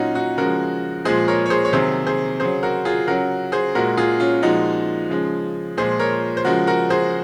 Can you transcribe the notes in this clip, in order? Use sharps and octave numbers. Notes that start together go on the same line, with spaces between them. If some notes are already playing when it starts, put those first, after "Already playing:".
Already playing: A#2 F#3 C#4 D#4 F4 F#4
D#4 F#4
C#3 F3 G#3 F#4 A#4
A#2 F3 G#3 G#4 C5
A#4 C#5
C#5
G#4 C5
C#5
C3 D#3 F#3 G#4 C5
G#4 C5
C#3 F#3 G#4 C5
F#4 A#4
F4 G#4
C#3 F#3 F#4 A#4
G#4 C5
A#2 G#3 F#4 A#4
F4 G#4
C#4 F4
A#2 F3 G#3 D#4 F#4
C#3 F3 G#3
A#2 F3 G#3 G#4 C5
A#4 C#5
C5
C#3 F3 G#3 F#4 A#4
F#4 A#4
G#4 C5